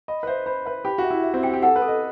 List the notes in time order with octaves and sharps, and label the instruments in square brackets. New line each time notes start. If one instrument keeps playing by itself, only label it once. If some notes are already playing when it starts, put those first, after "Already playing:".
[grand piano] D#5 [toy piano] B5
[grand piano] B4
[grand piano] C5 [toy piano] E5
[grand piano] C5 [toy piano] B5
[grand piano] B4 [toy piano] E5
[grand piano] G4 [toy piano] B5
[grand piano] F#4
[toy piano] E5
[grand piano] E4
[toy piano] E5
[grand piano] C4
[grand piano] G4 [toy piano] G5
[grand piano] G4
[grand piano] A4 [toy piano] F#5
[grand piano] B4
[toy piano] A4
[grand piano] D#5